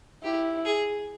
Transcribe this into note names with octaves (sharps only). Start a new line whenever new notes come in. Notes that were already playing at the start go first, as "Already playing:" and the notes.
E4 G4
G#4